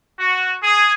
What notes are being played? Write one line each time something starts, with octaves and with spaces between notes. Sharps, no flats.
F#4
G#4